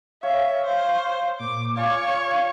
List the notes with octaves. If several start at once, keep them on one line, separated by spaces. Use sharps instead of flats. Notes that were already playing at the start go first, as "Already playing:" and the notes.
C#5 E5 F5
C5
A#2 D6
F4 C#5 D5 F5 G#5